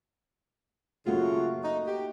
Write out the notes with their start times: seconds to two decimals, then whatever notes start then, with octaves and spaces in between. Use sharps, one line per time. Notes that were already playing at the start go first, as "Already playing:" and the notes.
1.07 F#2 C#3 A3 A#3 F4 F#4
1.63 D#4
1.87 G4